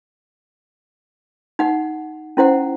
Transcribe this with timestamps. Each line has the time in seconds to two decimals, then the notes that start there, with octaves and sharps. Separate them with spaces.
1.59 D#4 F#5
2.37 C#4 E4 C5 F#5